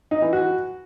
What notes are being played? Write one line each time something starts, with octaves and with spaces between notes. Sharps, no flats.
D#4
E3
F#4